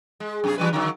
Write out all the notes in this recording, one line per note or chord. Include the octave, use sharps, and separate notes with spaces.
G#3
F#2 C3 G#4
E3 G3 B4
D3 D#3 F#3